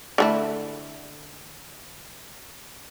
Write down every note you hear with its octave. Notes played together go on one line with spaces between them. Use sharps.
D3 A3 E4